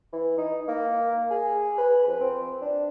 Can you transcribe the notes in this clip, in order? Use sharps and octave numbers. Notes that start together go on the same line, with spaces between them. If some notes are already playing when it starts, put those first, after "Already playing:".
E3
D#4
A#3
G#4
B4
F2
C4
D4